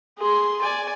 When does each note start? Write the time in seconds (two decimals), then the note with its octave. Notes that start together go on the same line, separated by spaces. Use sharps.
0.18 G#4 C6
0.62 D5 G#5